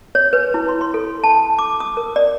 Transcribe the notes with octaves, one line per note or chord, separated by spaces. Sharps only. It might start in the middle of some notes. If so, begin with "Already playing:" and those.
C#5
B4
E4
C6
C6
A4
A5
D6
D#6
A#4
D5